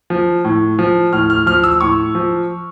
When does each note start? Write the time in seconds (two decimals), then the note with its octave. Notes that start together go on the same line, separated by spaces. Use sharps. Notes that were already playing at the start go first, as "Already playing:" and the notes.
0.10 F3
0.45 A2
0.79 F3
1.13 A2 F6
1.30 F6
1.46 F3 F6
1.64 E6
1.81 A2 C#6
2.15 F3